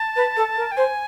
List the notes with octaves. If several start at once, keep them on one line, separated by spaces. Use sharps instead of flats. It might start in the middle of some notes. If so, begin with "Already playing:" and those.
Already playing: A5
B4
A4
A#4
G5
C5 G#5